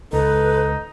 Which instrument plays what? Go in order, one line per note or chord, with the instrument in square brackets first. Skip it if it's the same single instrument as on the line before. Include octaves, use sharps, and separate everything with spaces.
[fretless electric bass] C#2 [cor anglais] D#4 [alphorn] A4 [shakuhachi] B4